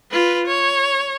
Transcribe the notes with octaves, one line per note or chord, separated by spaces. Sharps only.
F4 B4
C#5